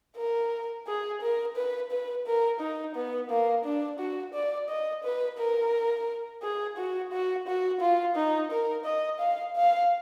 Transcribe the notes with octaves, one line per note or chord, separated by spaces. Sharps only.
A#4
G#4
A#4
B4
B4
A#4
D#4
B3
A#3
D4
F#4
D5
D#5
B4
A#4
G#4
F#4
F#4
F#4
F4
D#4
A#4
D#5
F5
F5